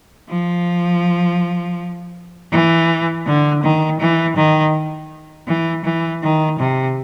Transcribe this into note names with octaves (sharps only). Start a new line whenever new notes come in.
F3
E3
D3
D#3
E3
D#3
E3
E3
D#3
C3